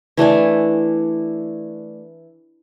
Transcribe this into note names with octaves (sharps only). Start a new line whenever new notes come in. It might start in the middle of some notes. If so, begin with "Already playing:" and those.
E3 A3 D4 G#5